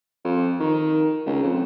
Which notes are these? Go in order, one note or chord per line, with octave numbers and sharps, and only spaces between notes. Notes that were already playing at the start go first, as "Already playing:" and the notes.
F2
D#3
C#2
F2